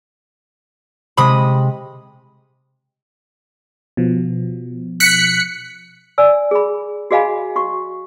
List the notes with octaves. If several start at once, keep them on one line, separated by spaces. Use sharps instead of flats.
C3 G#3 B5 D#6
B2 F3
F#6 B6 C#7
D5 G#5 E6
G#4 B5
F#4 G#4 D#5 F5 G#5 B5
F#4 C#6